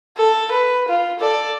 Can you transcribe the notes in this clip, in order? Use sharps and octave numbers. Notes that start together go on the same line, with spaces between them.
A4
B4
F4
A4 D5